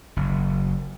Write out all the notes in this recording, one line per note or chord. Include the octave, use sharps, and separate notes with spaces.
F#1